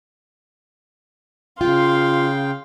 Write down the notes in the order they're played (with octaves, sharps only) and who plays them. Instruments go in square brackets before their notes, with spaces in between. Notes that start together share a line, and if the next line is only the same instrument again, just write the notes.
[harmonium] C#3 G5 [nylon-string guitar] F4 [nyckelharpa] F5 C6